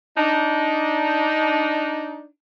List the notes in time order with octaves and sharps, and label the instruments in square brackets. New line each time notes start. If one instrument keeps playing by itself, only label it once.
[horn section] D4 D#4